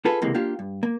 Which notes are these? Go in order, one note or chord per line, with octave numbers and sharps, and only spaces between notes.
F4 G#4 A4 B4
C#2 C3 E3 G#3 A#3
A#3 D4 F4 G4
G2
A#3